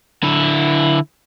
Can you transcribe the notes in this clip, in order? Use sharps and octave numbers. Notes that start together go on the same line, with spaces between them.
D3 E4